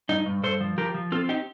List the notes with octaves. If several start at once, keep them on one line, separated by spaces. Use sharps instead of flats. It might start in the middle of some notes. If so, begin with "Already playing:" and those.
G2 D#4
G2
G2 A4 C5
F3
F3 G4 A#4
F3
C4 F4 A4
D#4 G4